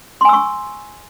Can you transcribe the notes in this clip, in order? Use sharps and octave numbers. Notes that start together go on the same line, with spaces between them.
G#5 C6 C#6 E6